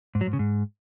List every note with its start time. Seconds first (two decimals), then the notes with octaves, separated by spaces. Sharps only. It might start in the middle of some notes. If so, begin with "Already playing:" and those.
0.15 G#2
0.21 F#3
0.27 G#2
0.33 C#3
0.39 G#2